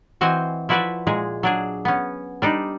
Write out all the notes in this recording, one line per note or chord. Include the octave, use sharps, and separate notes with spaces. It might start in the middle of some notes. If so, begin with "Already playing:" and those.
E3 C4 F#4 C5 D#5 G#5
F3 E4 F#4 B4 D5 E5
A#2 G#3 G#4
F#3 D4 G#4
B3 C#4
G3 D4 D#4